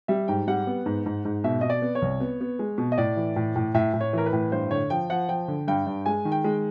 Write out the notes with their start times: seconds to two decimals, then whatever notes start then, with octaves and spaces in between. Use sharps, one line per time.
0.08 G3 E5
0.28 G#2 G5
0.47 G3 F#5
0.67 B3
0.86 G#2
1.06 G#2
1.25 G#2
1.44 B2 E5
1.61 B2 D#5
1.70 D5
1.82 B3
1.95 C#5
2.02 C2
2.20 B3
2.41 B3
2.59 G#3
2.78 B2
2.92 D#5
2.98 A2 D5
3.16 E3
3.36 A2
3.56 A2
3.74 A2 E5
3.94 A2
4.01 C#5
4.13 E3 A#4
4.26 B4
4.33 A2
4.52 G2 C5
4.71 D3 C#5
4.90 F3 G5
5.10 F3 F#5
5.29 F3 G5
5.48 D3
5.68 G2 G5
5.86 G2
6.06 G#3 G#5
6.25 D#3
6.32 G5
6.44 G#3